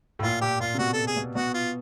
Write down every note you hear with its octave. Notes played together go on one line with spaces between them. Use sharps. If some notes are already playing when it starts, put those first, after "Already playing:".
A2
A#2 F4
A#2 G4
A#2 F4
C3
B2 F#4
A4
G#4
B2
B2 F#4
F4